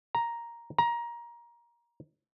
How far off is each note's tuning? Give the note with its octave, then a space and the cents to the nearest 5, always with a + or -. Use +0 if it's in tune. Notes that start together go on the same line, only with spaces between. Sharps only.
A#5 +5
A#5 +20